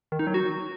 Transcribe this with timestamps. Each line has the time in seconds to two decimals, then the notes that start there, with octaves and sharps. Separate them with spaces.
0.12 D#3
0.19 D#4
0.27 F#3
0.34 F#4